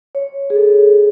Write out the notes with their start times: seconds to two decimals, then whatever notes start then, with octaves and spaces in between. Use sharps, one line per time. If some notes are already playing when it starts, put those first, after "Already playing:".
0.15 C#5
0.50 G#4
0.56 A4